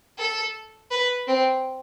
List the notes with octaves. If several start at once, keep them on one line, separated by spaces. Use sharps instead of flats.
A4
B4
C4